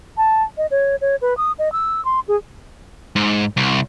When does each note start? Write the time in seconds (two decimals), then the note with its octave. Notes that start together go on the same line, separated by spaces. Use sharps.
0.17 A5
0.58 D#5
0.71 C#5
1.01 C#5
1.21 B4
1.37 D#6
1.59 D#5
1.72 E6
2.05 C6
2.28 G#4
3.16 G#2
3.57 C2